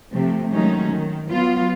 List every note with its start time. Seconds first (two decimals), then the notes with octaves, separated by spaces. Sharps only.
0.13 C3 F3 A3
0.52 D#3 F#3 G#3 A3 C#4 D#4
0.90 D#3
1.30 F#3 B3 F4